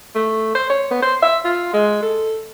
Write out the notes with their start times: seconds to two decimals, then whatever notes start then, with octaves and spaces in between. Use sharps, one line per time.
0.15 A3
0.55 C5
0.70 C#5
0.91 B3
1.02 C5
1.23 E5
1.45 F4
1.73 G#3
2.02 A4